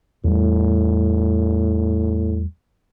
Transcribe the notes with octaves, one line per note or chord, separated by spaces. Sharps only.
E2 A2 G3